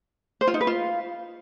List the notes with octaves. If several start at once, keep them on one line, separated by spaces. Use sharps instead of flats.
C5
F4
D#4
B4
F4